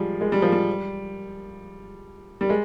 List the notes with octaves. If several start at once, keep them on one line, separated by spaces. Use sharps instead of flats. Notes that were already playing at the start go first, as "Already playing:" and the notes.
Already playing: F3 G3 G#3
G#3
G3
F3
G3
G3
G#3